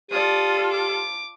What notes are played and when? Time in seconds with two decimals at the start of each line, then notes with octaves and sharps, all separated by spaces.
0.11 F4 G4 A4 D5 D#6
0.71 D6